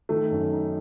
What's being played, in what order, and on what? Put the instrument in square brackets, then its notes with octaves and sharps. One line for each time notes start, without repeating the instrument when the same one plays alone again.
[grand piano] D#3 [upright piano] A3
[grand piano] F#2
D#4